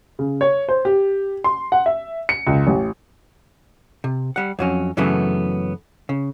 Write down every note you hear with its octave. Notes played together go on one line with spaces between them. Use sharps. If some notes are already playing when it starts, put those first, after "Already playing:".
C#3
C#5
C5
G4
C6
F#5
E5
C#7
C#2
A1
C3
G3 F#5
F2 F#3 C#4
F#2 C#3 E3 F#3 A3 B3
C#3